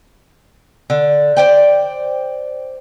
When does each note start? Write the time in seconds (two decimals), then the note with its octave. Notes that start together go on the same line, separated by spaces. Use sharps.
0.90 D3
1.37 C5 D5 G5